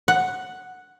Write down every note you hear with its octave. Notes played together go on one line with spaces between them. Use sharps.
F#5